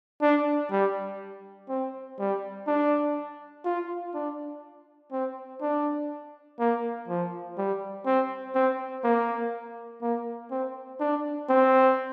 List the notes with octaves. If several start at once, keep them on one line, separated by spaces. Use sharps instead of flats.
D4
G3
C4
G3
D4
F4
D4
C4
D4
A#3
F3
G3
C4
C4
A#3
A#3
C4
D4
C4